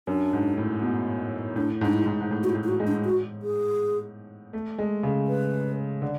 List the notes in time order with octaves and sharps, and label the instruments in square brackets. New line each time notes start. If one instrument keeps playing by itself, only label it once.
[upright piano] F#2 [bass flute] D4
[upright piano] G#2
A2
B2
[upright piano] A2 [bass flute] D4
[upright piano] G#2 [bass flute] D4
[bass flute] E4
[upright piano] G#2
G#2
A2
[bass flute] F#4
E4
[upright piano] A2
[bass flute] E4
F#4
[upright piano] G#3
[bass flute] D4
F#4
G#4
[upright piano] A3
G#3
C#3
[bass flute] B4
[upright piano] D3